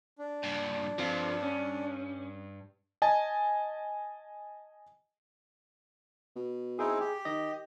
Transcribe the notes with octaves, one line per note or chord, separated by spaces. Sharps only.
D4
G2 A#2
G2 F3 C4 F4
C#4
D#5 G#5 A5
B2
C4 D#4 E4 G#4 G5
G4
D#3 D#5